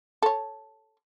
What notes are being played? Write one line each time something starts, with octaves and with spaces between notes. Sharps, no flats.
A4 C#5